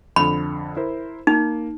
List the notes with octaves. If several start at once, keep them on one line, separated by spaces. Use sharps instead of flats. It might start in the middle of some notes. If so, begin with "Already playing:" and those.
F2 D3 B5
E4 A#4 C5
A#3 D#4